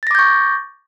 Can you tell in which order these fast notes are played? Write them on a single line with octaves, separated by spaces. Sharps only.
A6 A#6 D6 G6 C#6